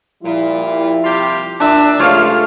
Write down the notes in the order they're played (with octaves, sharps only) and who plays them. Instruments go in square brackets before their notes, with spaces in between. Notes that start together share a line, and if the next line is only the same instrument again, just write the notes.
[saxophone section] A#2 [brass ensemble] F3 G3 E4
[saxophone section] C3 F4 G4
[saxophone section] A#2 D5 E5 [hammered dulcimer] D4
[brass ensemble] C#2 C#3 A3 [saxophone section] G2 F3 [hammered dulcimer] F4 C#5 F5